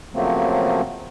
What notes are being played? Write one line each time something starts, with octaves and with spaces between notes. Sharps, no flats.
C#3 F3 F#3 A3 A#3 C4